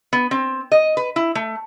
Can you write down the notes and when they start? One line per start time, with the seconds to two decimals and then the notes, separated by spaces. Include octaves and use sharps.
0.13 B3
0.31 C4
0.72 D#5
0.97 B4
1.16 E4
1.35 A3